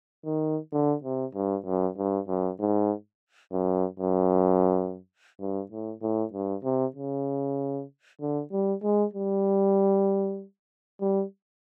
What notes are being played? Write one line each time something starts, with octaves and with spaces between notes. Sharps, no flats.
D#3
D3
C3
G2
F#2
G2
F#2
G#2
F#2
F#2
G2
A2
A2
G2
C3
C#3
D3
G3
G#3
G3
G3